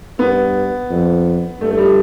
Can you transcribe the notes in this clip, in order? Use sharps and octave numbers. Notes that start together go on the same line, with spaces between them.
G2 B3
F2
G2 A3
A3
G3